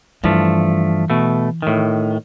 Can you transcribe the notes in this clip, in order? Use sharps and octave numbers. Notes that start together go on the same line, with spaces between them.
G2 E3 F3 A3
B2 A3
A2 D#3